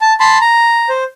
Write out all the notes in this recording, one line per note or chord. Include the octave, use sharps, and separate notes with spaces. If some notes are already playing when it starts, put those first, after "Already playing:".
A5
A5 B5 C6
A#5
C5